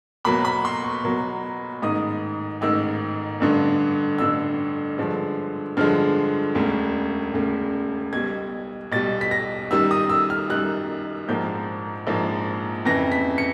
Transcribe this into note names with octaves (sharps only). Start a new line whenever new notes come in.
E2 B2 F#3 A#3 B5
B5
C6
C#6
E2 B2 F#3 A#3
A1 G#2 D#3 D#6
A1 G#2 D#3 E6
A1 G2 D3
A1 G2 D3 E6
G2 D3 F3 G#3
G2 D3 F3 G#3 F6
E1 D2 C#3
E1 D2 C#3
B1 B2 G3 G#6
B1 B2 G3 A6
B6
A#6
F#2 D#3 G3 E6
D#6
E6
F6
F#2 D#3 G3 F#6
A#1 G#2 F3 A#3 G6
A#1 G#2 F3 A#3
F2 C#3 E3 A#6
B6
C#7